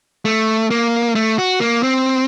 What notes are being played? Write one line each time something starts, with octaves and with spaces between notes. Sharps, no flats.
A3
A#3
A3
F#4
A#3
C4